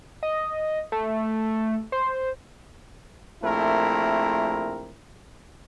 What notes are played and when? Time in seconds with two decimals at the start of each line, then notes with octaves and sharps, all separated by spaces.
0.23 D#5
0.92 A3
1.92 C5
3.42 A#1 A3 C4 E4 A#4